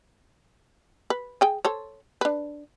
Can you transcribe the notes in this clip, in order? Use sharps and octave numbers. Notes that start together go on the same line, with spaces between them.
B4
G#4 G5 G#5
A4 C5 C#5
D4 B4